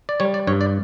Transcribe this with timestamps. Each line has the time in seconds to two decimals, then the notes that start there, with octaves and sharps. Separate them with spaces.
0.09 D5
0.20 G3 C#5
0.34 D5
0.47 G2 C#5
0.61 D5